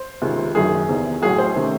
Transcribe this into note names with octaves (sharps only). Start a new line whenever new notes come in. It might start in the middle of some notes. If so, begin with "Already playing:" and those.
Already playing: C5
C#2 C3 D#3
F#1 F#2 D#3 G#4
E2 C3 D#3
A1 A2 F#3 G#4
C5
C3 D#3 A3 C#4